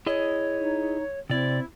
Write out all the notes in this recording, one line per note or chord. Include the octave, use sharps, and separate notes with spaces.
E4 G#4 C#5 D#5
D#4
C3 C4 E4 D5